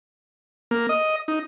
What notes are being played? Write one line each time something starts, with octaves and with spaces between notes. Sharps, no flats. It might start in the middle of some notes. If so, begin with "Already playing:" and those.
A#3
D#5
D#4